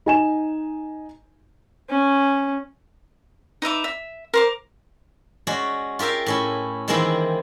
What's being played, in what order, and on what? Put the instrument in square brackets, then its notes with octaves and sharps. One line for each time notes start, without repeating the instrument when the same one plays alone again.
[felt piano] D#4 G#5 E7
[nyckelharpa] C#4
[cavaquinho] D#4 B4 E5 D6
E5
A#4 C5 D6
[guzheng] G#3 C#4 F#4 D5
F4 G4 A#4 E5 F5
A2 C#4 E4
D#3 E3 G#3 A#3 C4 E4